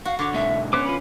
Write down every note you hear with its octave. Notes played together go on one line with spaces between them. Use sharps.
F#4 F5
D3 C#5 D6
G#2 B2 E5
B3 C#4 C5 D6 F#6
F4 B4 B5